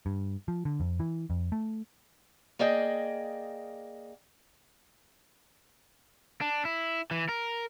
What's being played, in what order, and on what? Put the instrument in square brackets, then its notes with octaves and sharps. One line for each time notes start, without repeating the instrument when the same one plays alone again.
[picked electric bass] G2
F3
D3
F2
E3
F2
A3
[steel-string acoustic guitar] A#3 G#4 D5 D#5 G5
[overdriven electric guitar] D4
E4
E3
A#4